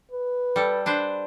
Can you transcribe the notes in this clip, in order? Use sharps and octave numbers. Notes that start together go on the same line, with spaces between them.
B4
G3 A4
D4 B4 C5